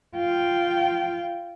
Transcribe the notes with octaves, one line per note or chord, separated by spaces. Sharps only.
F4 G5